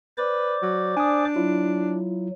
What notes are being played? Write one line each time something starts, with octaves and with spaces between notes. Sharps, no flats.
B4 C5 D5 D6
F#3
D4 G#5 D#6
F#3 E4 F4